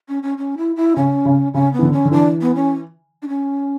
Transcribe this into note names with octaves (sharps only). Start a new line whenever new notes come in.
C#4
C#4
C#4
E4
E4
C#3 C#4
C#3
C#3 C#4
B3
E3
D3
C#4
D3
E3 D4
B3
C#4
D4
C#4